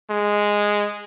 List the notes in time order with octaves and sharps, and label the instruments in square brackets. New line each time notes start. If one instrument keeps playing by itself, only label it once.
[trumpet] G#3